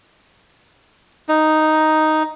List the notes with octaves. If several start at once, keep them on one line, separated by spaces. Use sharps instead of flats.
D#4